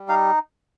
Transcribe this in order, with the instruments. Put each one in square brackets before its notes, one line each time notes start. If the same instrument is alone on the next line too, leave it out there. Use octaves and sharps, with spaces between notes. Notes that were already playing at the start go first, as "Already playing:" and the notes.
Already playing: [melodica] G3
D#4 F5